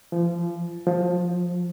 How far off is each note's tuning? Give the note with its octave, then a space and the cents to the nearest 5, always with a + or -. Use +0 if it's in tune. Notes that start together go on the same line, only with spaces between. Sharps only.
F3 -30
F3 +15